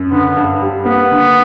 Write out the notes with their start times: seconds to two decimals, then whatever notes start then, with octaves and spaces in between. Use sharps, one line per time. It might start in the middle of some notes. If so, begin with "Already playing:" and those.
Already playing: F#2
0.11 D3 B3
0.37 G2
0.62 G3
0.85 A#3 B3
1.11 D3